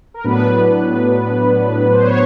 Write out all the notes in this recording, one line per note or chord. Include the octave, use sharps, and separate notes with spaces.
A#4
A2 F#3 B3 D4 B4
C5
C#5